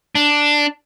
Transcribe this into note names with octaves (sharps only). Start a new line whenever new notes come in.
D4